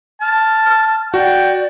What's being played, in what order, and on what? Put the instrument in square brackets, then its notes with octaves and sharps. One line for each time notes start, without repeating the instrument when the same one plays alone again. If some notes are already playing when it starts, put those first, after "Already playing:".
[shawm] A5 [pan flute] F6
[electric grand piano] F#4 [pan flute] D5 [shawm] G5